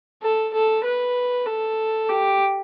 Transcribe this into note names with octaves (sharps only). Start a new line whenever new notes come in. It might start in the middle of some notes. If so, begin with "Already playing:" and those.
A4
A4
B4
A4
G4